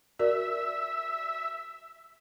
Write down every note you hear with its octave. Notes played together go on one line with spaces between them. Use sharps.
F#4 A#4 D5 E5